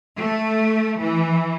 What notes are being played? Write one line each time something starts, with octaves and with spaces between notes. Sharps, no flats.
A3
E3